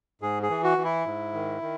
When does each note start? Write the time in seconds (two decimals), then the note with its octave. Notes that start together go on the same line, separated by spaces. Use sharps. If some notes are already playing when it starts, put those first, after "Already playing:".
0.21 G#2 G#4
0.43 G#4
0.50 E3
0.64 F#4
0.78 E3
0.84 E4
1.06 G#2
1.34 D#3
1.62 D#3